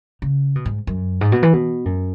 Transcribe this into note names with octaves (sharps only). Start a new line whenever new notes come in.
C#3
B2
G#2
F#2
G#2
B2
E3
B2
F#2